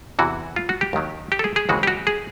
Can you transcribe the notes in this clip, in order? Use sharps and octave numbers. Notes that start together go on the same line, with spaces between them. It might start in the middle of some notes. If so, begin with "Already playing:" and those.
E2 C3 E3 F#4
F4
F#4
G4
D#2 D#3 F#3
G4
A4
G#4
G#4
D#2 C#3 E3 G#3 C4 F#4
G4
F#4
G#4